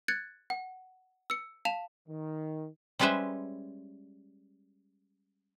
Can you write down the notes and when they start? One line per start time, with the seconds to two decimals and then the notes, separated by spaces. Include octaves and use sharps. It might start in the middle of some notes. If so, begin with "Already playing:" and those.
0.08 F#6 G#6 A6 C#7
0.50 F#5
1.30 E6 C#7
1.65 F5 A5 E7 F7
2.08 D#3
2.99 G3 G#3 C#4 B4 C5 E5